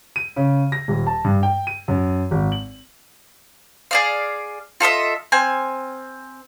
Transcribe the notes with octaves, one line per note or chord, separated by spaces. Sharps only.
D#7
C#3
A#6
D#1
A5
G2
G5
D#7
F#2
G#1
F#7
G#4 D5 F5
F4 A4 D#5 E5
C4 G#5 F6